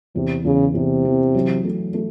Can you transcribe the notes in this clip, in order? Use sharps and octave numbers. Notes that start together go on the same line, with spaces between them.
E2 C3
E2 C#3
E2 C3
E3
F#3
A3
A3